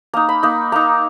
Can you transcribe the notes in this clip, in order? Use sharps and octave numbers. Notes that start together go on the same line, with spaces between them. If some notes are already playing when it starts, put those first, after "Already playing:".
A#3 D#4 A#5
B5
A#3 D#4
A#3 D#4 A#5